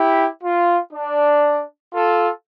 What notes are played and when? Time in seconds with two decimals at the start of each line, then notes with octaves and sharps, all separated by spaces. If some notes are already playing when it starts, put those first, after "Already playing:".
Already playing: E4 G4
0.43 F4
0.92 D4
1.93 F4 A4